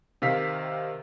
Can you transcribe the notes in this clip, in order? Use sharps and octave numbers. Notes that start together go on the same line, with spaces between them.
C3 D#3 F5 B6